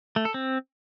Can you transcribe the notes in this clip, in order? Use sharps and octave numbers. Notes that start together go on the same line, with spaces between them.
A3
A4
C4